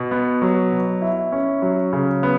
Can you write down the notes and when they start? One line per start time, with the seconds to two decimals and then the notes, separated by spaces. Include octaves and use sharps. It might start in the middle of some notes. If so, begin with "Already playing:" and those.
Already playing: B2
0.11 B3
0.42 F#3
0.72 B2
1.02 E4
1.32 C#4
1.62 F#3
1.93 C#3
2.23 B3